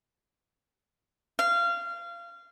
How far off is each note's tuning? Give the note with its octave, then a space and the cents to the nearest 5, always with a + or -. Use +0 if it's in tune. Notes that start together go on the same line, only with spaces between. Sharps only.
F5 -25